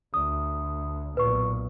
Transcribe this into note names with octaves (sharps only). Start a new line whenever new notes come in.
D2 D#6
B1 A#2 B4 C#6